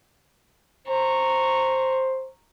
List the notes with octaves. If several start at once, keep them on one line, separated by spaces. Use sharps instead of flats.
C5 A#5 C#6